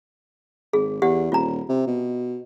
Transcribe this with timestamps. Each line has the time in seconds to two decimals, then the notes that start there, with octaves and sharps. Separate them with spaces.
0.73 G#1 G#4
1.02 E2 G4 F#5
1.32 D#1 F4 A#5
1.69 C3
1.87 B2